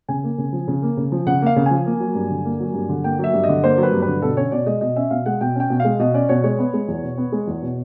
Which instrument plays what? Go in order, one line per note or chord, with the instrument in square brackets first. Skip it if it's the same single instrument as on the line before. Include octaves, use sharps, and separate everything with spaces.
[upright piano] C#3 G#5
A#3
C#3
F3
C#3
A#3
C#3
F3
C#3 F#5
A#3 F5
C#3
F3 G#5
A#3
F#3
G2
D3
A#3
F#3
G2
D3
A#3 G5
F#3 E5
G2
D#5
D3
A#3 C5
F#3
B4
G2
B4
D3
B2 A4
C#4 C#5
B2 D5
G#3 D#5
B2 D#5
C#4 E5
B2 F5
G#3 F#5
B2 G5
C#4 G5
B2
G#3 F5
B2 D#5
C#4 D5
B2 C#5
G#3 C#5
B3
G#3
E2
B2
B3
G#3
E2
B2